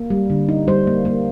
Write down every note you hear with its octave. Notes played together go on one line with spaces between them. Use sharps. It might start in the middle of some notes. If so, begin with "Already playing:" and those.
Already playing: A#3
G3
D3
D#4
G3 C5
A#3
A#3